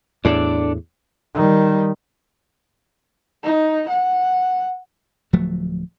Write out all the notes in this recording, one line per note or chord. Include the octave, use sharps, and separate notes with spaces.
E2 A2 D4 A4 D5
D#3 G3
D#4
F#5
D1 F3 F#3 A3